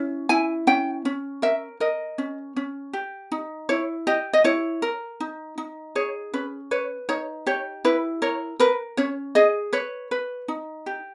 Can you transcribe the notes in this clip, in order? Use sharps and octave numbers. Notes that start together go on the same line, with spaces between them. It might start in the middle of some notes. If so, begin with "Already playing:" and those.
Already playing: C#4 E4
E4 G#5
C#4 G5
C#4
A#4 E5
A#4 D#5
C#4
C#4
G4
D#4
E4 C#5
G4 D#5
D#5
E4 C#5
A#4
D#4
D#4
G#4 C#5
C#4 B4
B4 C#5
D#4 C#5
G4 C#5
E4 B4
A#4 C#5
A#4 B4
C#4 C#5
G#4 D#5
B4 C#5
B4
D#4
G4